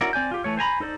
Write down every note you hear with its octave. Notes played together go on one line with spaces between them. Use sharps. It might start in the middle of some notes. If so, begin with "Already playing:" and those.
C#4 E4 F#4 A#4 D5
C4 D5 G#5 G6
F4 G4
E3 A3 C#5
C5 G#5 A#5 B5
D#4 A4 C5 D5